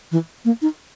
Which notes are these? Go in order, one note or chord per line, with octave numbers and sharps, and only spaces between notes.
E3
A#3
D#4